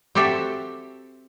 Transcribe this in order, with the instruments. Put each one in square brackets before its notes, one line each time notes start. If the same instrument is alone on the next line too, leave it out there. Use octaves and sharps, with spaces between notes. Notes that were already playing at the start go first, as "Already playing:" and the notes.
[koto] C4 F#4 G4 A4 E5